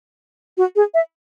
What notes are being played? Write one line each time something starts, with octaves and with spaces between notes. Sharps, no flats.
F#4
G#4
E5